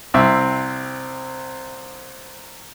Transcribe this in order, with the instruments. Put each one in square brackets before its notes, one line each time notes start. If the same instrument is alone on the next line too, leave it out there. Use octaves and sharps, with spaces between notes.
[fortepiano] C2 C4 E5